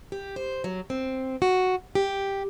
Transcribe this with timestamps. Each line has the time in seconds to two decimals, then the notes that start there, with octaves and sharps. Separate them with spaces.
0.12 G4
0.36 C5
0.64 F#3
0.90 C4
1.42 F#4
1.95 G4